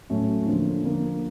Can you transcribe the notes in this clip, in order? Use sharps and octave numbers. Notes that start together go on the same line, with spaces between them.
A2 F#3 A3 C#4
D3 F3 A#3
D3 F3 A#3